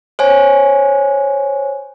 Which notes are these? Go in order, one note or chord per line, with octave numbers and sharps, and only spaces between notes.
C5 C#5 G#5